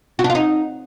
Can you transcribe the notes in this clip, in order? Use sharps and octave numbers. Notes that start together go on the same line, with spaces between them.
F#4
D4
F4
D#4